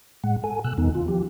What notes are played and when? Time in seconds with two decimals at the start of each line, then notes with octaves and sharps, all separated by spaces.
0.24 A2 G#3 F#5
0.44 A4 G#5
0.64 B2 E6 F#6
0.78 E2 D#3 B3 D#4
0.95 F4
1.08 F3 G4